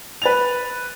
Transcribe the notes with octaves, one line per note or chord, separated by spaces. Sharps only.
B4 A6 F7